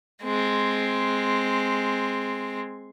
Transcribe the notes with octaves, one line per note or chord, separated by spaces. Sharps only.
G#3 C4